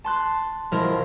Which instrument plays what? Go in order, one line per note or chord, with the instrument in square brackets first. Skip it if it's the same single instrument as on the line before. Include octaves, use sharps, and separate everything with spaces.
[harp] A5 C6 F#6
E1 F3 E4 A#4 C6